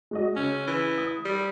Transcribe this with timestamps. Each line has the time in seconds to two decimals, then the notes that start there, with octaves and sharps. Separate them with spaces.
0.11 G#3 F#4 D#5
0.36 C#3 C#4
0.67 E3
0.98 D#6
1.25 G3